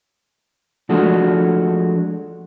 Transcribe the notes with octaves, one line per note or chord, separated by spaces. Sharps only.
F3 G#3 A3 D4 F#4